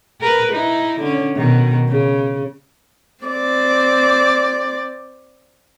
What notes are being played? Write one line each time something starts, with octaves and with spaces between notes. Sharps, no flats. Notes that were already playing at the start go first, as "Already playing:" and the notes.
A#4 B4
D#4 E4
D3 C#4
B2 D#3
C#3
C4 D5